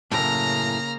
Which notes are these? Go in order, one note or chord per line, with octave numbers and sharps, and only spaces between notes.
F#2 A2 C#3 A#3 A#5 F6